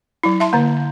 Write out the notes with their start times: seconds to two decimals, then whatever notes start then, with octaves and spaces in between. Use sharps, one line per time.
0.23 F#3 E4
0.40 E5 A5 C6
0.53 D3 A#3